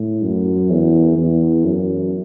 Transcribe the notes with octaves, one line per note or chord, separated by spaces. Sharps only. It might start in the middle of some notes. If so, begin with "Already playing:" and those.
Already playing: A2
F#2
E2
E2
F#2